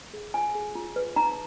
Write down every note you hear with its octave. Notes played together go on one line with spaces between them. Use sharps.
G#4
F4 G#5
G#4
F4
B4
D#4 A#5